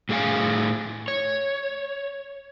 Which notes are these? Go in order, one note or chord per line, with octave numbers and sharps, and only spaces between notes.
A2 G#4 F5 G#5
C#5